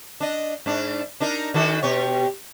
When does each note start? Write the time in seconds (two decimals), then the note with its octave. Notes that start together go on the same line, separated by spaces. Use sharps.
0.20 D4 D#5
0.66 G#2 D4
1.20 D4 D#4 A#4
1.54 D#3 F#4 A4
1.83 B2 G4 C#5